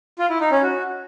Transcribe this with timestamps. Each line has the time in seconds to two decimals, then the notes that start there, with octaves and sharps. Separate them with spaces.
0.19 F4
0.30 E4
0.41 D#4
0.52 C#4
0.63 F#4